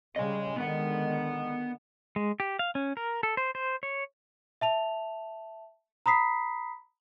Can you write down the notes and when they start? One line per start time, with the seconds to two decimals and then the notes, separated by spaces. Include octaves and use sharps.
0.16 C#3 G3 D#5 G#5
0.56 D3 D#3 G#3 B3 F#5
2.16 G#3
2.40 G4
2.59 F5
2.75 C#4
2.97 A#4
3.23 A4
3.37 C5
3.55 C5
3.83 C#5
4.61 E5 A5 F7
6.06 A#5 B5 D#6 B6 C7